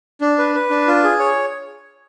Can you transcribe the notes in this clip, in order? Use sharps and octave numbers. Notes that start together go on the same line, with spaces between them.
D4
B4
B4
D4
F4
G#4
C#5